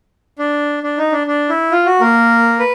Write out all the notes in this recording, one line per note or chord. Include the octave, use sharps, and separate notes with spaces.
D4
D4
D#4
D4
D4
E4
F4
F#4
A#3 A#4
B4